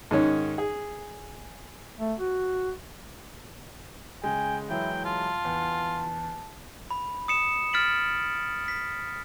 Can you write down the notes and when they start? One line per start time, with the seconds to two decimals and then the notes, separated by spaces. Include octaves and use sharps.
0.11 G#2 D#3 C#4
0.58 G#4
1.99 A3
2.19 F#4
4.24 C#3 G#3 G5 G#5
4.70 E3 F#3 G#3 E4 G5
5.05 F4 A5
5.45 E2
6.91 B5
7.28 D#6 C#7 E7
7.73 F6 A6 B6 D7 F#7
8.68 B6